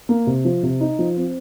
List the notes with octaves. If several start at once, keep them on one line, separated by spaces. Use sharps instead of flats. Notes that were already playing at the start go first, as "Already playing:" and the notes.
A#3
C3
F3
C3
D#4
F3
C4